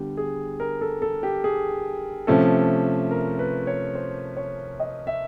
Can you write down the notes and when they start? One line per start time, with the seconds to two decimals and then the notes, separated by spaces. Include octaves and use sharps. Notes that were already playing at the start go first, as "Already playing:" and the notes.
Already playing: D3 G3 B3 G4
0.17 G#4
0.60 A#4
0.81 A4
1.02 A4
1.23 G4
1.44 G#4
2.27 C3 F3 A3 C#4 A4
3.11 A#4
3.39 B4
3.67 C#5
3.95 C5
4.37 C#5
4.80 D#5
5.07 E5